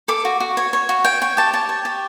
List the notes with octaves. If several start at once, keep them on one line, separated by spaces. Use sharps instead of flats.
A4 D6
F#4
F#4
C#5
C#5
F#4
C#5 G5
C#5 G5
G4 A5
C#5 A5
C#5
G4